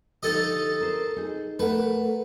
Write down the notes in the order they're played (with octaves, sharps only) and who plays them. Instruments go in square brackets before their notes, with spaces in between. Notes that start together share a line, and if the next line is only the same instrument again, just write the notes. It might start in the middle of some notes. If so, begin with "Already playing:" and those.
[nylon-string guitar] D3 F3 G4 [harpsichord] D#4 A4 D#5
[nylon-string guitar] A#4 C5
D#4 G#4
[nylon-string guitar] A3 A#4 F#5 [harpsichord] B4